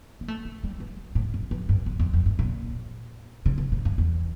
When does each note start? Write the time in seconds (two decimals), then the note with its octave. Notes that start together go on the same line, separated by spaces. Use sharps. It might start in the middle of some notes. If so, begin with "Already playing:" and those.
0.21 A#3
0.28 A3
0.45 A3
0.64 G3
0.80 G3
1.15 A2
1.34 G2
1.51 F2
1.69 G2
1.86 E2
2.00 F2
2.13 F2
2.26 G2
2.39 A#2
3.46 C#3
3.58 A2
3.72 A2
3.85 G2
3.98 E2